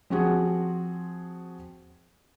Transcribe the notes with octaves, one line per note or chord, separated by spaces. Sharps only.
F3 C4 F#4 G#4